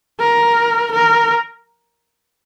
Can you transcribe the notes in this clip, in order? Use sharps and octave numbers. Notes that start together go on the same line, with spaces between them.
A#4
A#4